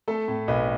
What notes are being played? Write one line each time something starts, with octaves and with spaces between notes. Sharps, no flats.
A3 A4
A2
B1 B4